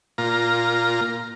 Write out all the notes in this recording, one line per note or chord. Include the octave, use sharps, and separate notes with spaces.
A#2 F4 A#5